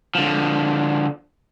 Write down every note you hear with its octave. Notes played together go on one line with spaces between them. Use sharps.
D3 F3